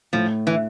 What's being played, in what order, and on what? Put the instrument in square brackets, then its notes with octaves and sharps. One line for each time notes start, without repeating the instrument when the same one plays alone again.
[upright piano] A2 [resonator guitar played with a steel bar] F3
[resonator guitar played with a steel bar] E3